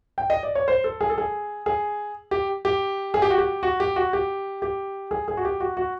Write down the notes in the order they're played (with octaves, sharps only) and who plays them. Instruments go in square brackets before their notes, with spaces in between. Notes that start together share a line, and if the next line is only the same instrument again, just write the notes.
[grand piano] G5
D#5
D5
C#5
C5
A4
G#4
A4
G#4
G#4
G4
G4
G#4
G4
F#4
G4
F#4
G4
F#4
G4
G4
G#4
G#4
F#4
G4
F#4
F#4